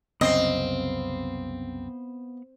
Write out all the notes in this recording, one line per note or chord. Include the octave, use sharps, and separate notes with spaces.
C2 F#2 C#3 B3 C4 D#5 F5